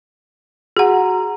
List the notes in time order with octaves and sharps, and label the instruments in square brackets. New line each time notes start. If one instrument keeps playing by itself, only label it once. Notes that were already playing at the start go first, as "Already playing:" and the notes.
[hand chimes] F#4 A#5 [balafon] G#4 F#5